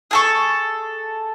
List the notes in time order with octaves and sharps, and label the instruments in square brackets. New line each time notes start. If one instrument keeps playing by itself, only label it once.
[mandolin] G#4 A4 C#6